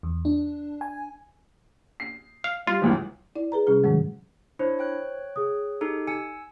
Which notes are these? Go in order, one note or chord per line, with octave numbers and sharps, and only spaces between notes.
E2
D4
G#5
C7
F5
G3 F4
G1 C#2 E3
E4 D5
G#4 B4 A#5
C3 G3 C#4 G#4 F6
G#2 C3 D#3 F#3 G#3
D4 E4 C5 C#5
C#5 G5 F#6
G#4 D#6
D#4 G4 A4
G#5 E6 C#7